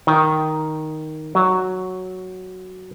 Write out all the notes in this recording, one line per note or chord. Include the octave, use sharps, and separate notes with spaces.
D#3
F#3